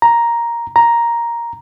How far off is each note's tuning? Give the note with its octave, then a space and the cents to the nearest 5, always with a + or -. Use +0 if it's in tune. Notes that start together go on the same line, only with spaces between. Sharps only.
A#5 +5
A#5 +5